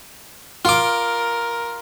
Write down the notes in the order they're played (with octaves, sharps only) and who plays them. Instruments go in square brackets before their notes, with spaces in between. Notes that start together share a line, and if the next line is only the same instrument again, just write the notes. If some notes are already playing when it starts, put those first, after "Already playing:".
[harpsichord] F4 D6 [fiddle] A#4